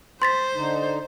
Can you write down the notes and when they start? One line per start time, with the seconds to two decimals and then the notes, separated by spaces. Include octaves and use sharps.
0.22 C5 C6 A6 B6
0.55 D3 D#4